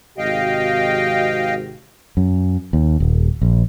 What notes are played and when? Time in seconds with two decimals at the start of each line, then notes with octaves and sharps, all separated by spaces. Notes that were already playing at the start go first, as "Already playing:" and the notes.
0.18 G#1 C3 F#4 D#5 F5 G5
2.17 F#2
2.73 D#2
3.00 D#1
3.41 A#1